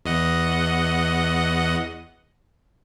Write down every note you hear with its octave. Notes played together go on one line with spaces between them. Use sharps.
E2 D#5 F#5